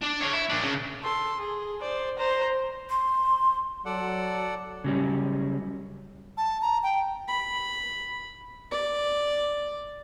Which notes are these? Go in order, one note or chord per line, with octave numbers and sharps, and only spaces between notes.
D4
C#5 F5
E4
A#2 D4
C#3
A4 C6
G#4
C5 D5
C5 A#5
C6
F#3 A4 D5 F#5
C#3 F#3 G3 C#4
A5
A#5
G5
B5
D5